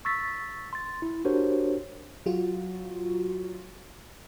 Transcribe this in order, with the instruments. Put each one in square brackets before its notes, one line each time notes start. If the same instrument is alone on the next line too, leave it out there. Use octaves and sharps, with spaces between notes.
[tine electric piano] C#6 E6 A6 B6
C6 A6
E4
D4 F#4 G4 A#4 C5 C#5
[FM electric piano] F#3 F4 F#4